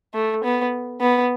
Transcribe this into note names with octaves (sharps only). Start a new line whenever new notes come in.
A3
B3
B3